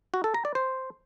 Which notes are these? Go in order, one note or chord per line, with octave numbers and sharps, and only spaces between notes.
F#4
A4
A#5
D5
C5